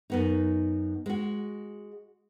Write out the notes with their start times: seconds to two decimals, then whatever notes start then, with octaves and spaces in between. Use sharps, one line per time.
0.10 F#2 B3 D#4
1.06 G#3 F#4